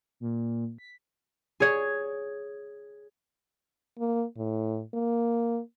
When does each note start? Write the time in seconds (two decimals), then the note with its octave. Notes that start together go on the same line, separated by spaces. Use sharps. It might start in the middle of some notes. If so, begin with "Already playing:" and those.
0.20 A#2
0.78 B6
1.60 G#4 C#5
3.99 A#3
4.37 A2
4.94 A#3